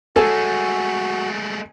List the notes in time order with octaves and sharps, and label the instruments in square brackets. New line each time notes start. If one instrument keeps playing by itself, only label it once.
[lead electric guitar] G#3 A3 [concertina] F#4 [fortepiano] A4 [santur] G#5